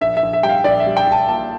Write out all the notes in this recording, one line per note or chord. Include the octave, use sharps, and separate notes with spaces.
A#1 E5
E5
A#1
E5
G3 G5
F5
A#1 D5
E5
G3
G5
A#1
A5
A#2 A5